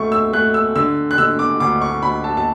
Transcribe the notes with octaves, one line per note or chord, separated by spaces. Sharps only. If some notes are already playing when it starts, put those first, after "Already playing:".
Already playing: D2 A3 C#6
E6
A3 F#6
E6
D3 E6
F#6
D3 E6
D6
D2 D6
C#6
D2 B5
A5
A5